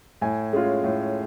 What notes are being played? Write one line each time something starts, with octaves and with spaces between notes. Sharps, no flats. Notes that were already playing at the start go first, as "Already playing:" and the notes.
A2 G#5
G#3 C#4 F4
A2